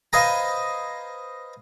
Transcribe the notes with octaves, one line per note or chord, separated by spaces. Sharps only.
B4 C5 D#5 F5 G#5 A#5